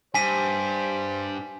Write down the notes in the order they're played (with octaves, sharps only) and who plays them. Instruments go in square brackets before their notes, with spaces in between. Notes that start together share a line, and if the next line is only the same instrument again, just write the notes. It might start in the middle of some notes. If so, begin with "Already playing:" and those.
[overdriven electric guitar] G2 [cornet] C5 [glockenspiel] G#5 B6 D#7